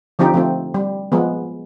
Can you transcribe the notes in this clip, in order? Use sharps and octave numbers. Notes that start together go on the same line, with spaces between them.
D3 F3 C4 D#4 G4
F3 A3 C4
G3
F3 G#3 B3